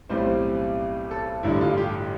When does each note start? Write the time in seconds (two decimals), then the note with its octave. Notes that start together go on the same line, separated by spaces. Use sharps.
0.09 B1 A2 G3 C4 C5
1.11 A4
1.43 A1 G2 D3 G3 E4
1.61 F4
1.78 G4